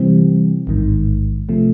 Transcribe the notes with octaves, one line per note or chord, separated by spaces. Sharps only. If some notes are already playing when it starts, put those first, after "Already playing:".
Already playing: C3 E3 G3 C4
A1 G#2 D#3
C3 F3 A3